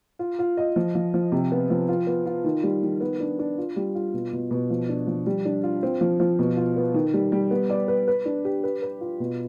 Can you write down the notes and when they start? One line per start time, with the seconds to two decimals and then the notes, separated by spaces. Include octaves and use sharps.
0.19 F4
0.39 F4
0.57 D#5
0.76 F3
0.95 F3
1.14 F3
1.32 C3
1.52 B3
1.70 F3
1.89 F4
2.07 B3
2.26 F4
2.44 D#3
2.63 G3
2.83 D#3
3.01 B3
3.20 D4
3.39 D4
3.58 F4
3.76 G3
3.95 F4
4.14 B2
4.33 B2
4.51 B2
4.70 F3
4.89 D4
5.07 F3
5.27 G3
5.45 D4
5.63 F4
5.83 C4
6.01 F3
6.20 F3
6.39 B2
6.57 F4
6.76 B3
6.94 D#3
7.14 G3
7.32 G3
7.51 B3
7.70 D5
7.88 B4
8.08 B4
8.25 D4
8.45 G4
8.64 B4
8.82 B4
9.01 F4
9.20 B2